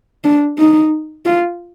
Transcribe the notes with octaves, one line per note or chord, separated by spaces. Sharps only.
D4
D#4
F4